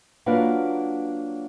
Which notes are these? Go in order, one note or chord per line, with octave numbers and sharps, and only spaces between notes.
F#3 A#3 D4 F4 B4 F#5